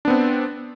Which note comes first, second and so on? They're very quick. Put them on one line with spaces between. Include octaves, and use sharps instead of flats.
D4 B3 C4